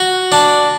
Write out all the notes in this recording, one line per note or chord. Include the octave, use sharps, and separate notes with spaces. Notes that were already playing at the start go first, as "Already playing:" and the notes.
Already playing: F#4
D4